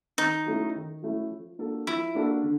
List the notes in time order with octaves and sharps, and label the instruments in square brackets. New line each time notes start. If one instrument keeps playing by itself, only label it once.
[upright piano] D#3 [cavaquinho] D#4
[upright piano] F#3 A3 C#4 E4
D#3
F#3 A3 C#4 E4
F3
A#3 D4 F#4 A4
[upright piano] F3 [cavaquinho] E4
[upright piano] A#3 D4 F#4 A4
D3